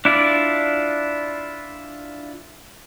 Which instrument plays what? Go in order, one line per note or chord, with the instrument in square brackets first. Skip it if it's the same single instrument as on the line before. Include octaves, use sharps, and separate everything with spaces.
[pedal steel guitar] D4 E4 F4 D5